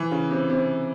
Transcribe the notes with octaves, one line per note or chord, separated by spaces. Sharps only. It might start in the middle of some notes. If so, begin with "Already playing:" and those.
Already playing: E3
C#3
C3
C3